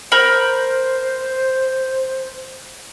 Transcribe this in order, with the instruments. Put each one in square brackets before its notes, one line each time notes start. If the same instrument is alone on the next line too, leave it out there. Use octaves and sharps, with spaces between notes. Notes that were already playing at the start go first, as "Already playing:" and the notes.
[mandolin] A#4 B5 G6 [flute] C5